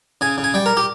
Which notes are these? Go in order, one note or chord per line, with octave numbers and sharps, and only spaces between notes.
C#3 G#5
C#3
G#5
G3 G5
A#4
G4